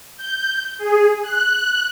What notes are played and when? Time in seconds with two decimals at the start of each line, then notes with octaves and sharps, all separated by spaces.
0.17 G6
0.78 G#4
1.22 F#6